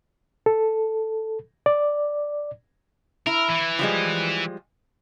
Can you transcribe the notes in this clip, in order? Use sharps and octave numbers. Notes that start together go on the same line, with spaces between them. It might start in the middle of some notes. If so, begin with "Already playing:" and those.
A4
D5
E4 A#4
E3
F3 G3 G#3